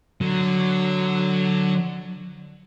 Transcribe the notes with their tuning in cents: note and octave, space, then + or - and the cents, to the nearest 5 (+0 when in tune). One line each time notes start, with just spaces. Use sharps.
D3 +10 F#3 +0